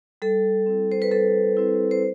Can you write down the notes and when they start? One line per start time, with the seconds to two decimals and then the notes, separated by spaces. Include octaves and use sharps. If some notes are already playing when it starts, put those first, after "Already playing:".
0.22 G3 A4
0.66 C4 E4
0.92 C5
1.02 B4
1.11 G3 A4
1.57 C4 E4
1.91 C5